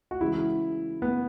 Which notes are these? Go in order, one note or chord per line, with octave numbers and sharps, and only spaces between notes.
F#4
C#3 E3 G#3 E4
B3